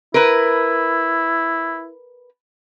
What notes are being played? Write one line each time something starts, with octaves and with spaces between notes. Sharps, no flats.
E4 A#4 B4